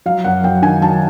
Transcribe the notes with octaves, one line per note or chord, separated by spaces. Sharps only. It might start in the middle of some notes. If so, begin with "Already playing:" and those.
F#3 F5
F#2 F#5
F#2 G5
D#3 G#5
F#3 A5